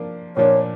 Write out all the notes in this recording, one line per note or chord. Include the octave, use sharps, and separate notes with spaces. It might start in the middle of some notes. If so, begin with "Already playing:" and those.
Already playing: F3 A#3 D4
A#2 F3 A#3 D4 C#5